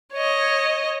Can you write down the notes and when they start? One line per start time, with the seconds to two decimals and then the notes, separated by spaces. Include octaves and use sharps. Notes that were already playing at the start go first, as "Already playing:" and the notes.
0.13 C#5 D#5